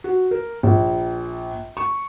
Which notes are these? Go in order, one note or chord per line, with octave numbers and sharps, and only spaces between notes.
F#4
A#4
A#1
C#6